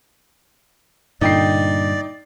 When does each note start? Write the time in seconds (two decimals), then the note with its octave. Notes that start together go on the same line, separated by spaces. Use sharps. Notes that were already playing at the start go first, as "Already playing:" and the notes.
1.21 G2 A#2 D3 D#4 D5 G5 C7